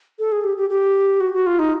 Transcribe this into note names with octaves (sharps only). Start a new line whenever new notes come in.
A4
G#4
G4
G4
G4
F#4
F#4
F4
D#4